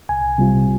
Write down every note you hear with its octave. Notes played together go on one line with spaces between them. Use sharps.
C2 G#5
C3 G3 C4 F4